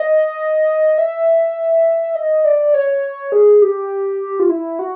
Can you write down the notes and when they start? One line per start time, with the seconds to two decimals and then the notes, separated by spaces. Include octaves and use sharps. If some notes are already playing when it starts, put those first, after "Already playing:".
Already playing: D#5
0.98 E5
2.15 D#5
2.44 D5
2.74 C#5
3.32 G#4
3.62 G4
4.40 F4
4.49 E4
4.79 F#4